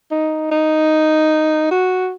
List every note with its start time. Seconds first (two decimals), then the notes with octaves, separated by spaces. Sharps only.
0.11 D#4
0.52 D#4
1.71 F#4